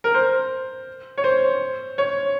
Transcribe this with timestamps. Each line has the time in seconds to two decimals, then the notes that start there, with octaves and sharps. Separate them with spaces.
0.04 A#4
0.14 C5
1.18 C#5
1.24 C5
1.98 C#5